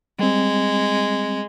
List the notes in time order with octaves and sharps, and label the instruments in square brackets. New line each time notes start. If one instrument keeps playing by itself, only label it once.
[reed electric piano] G3 C4 [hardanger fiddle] G#3